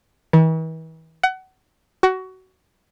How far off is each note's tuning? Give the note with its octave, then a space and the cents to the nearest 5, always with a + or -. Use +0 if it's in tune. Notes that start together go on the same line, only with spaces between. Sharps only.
E3 -40
F#5 +25
F#4 +20